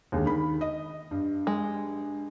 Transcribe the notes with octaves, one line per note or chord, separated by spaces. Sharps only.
D#2 D3 G#3
D#3 B5
D#5
G2
G#3